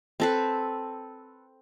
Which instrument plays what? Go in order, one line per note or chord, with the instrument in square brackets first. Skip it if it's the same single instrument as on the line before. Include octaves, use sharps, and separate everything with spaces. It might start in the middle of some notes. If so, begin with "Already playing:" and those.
[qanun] C4 A4 B4